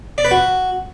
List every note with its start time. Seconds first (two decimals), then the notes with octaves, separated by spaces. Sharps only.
0.18 D5
0.25 B4
0.31 F#4